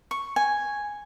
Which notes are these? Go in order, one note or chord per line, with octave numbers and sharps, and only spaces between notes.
C#6
G#5